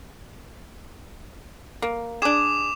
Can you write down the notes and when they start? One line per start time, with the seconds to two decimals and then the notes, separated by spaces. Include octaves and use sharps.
1.82 A#3
2.22 D4 G#4 D6 E7